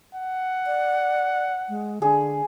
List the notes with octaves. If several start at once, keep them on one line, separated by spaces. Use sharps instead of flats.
F#5
D5
G#3
D3 G#4